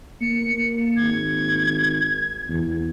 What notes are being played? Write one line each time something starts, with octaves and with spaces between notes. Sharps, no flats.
A#3 C#7
G#1 G#6
E2